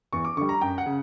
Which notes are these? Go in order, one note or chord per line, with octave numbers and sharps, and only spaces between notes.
E2 C#6
D6
D3 G3 C#6
A#5
F#2 G5
F#5
C#3